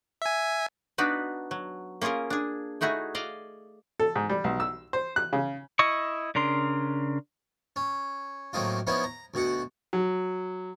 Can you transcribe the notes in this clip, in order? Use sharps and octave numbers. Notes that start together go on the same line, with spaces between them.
E5 G#5
B3 D4 D#4 F#4 B4
F#3
A#3 C#4 F4 G#4 A#4
D4 G#4
A3 D#4 E4 F#4 G#4
D5 D#5 F5
A4
G#2
G3
B1
E6
C5
F#6
C#3
E4 D#5 C#6
C#3 D4 A#4 C6
C#4
A2 F#3 A#3 C4 D#4 F4
F3 B3 C#4 D#4 E4
A#5
D2 B2 F#4 F#5
F#3